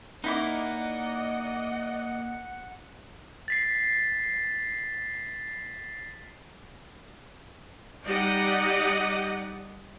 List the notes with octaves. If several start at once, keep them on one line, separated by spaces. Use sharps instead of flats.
A#3 D#4 E4 D5 D#5 F#5 D6
A6 B6 C7
G3 D#4 G4 D5 D#5 F#5